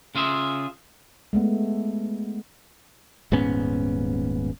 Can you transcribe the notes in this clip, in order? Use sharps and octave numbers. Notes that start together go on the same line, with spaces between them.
C#3 F4 G#4 E5
G#3 A3 B3
D#1 G#2 B3 C#4